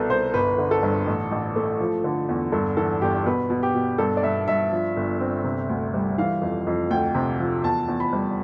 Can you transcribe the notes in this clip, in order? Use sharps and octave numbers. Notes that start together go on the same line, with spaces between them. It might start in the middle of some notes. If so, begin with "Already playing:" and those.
Already playing: C2 B2 A4 B4
C2 C5
G1 B4
D3
A4
G2
A1
A1
A3
F3
D3
E2
G2 A4
E3 A4
G1 G4
B2 B4
B2
G4
B2
G2 A4
D5
G2 E5
G2 E5
F3
G1
C4
C3
D2
G3
E3 F5
F2
F2
D2 G5
C3
F3
E2 A5
E2
B5
G3